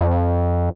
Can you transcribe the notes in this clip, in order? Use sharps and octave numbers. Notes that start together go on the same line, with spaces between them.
F2